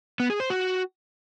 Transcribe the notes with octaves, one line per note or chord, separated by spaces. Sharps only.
B3
G#4
C5
F#4